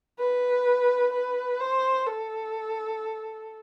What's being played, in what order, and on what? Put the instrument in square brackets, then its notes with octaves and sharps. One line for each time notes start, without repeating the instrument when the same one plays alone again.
[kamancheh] B4
B4
C5
A4